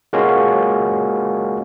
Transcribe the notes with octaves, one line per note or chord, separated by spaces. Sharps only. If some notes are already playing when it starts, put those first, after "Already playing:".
G#3 A#3 C#4 F4 F#4 F5